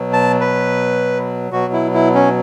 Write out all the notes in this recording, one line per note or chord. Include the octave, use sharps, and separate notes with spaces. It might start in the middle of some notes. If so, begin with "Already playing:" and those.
Already playing: B2 F#3
A5
B4
B2 F#3 F#4
E4
E4
C#4